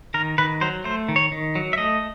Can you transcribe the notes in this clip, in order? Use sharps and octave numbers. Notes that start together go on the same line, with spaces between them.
D#3 A#4
D#3 B4
F#3 C5
A3 C5
D#3
C#5
D#3
F#3
E5
A3 D#5